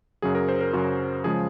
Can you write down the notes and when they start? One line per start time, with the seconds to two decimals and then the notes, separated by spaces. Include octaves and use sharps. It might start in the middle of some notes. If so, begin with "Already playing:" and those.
0.22 F#2 C#3 F#3 G#4
0.35 A#4
0.49 C5
0.61 A#4
0.73 F#2 C#3 F#3 F#4
1.24 C#3 F3 G#3 G#4